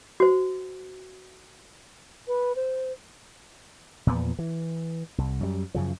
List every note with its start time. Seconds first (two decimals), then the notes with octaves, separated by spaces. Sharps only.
0.20 F#4 C5
2.28 B4
2.56 C5
4.07 E2 A#2 F3 B3
4.39 E3
5.18 C2
5.41 F#2 G3
5.74 F#2 C#3 F3